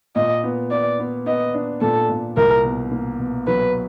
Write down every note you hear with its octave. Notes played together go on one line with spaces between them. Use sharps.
A#2 D#5
B3
B3 D5
B3
B3 D#5
D4
A#2 A4
A#2
C2 A#4
B2
A#3
B2
F#3 B4